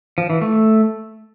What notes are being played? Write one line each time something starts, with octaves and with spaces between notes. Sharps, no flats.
F3
E3
A3